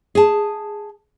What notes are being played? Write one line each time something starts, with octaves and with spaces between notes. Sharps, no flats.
G#4 A5